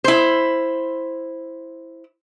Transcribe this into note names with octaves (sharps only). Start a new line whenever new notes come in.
E4 C5